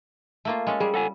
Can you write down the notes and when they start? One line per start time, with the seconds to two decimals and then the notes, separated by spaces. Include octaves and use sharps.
0.45 A3 A#3 F4
0.67 G#3 C#4 A4
0.80 G3 G#4
0.94 A4 F#5 G#5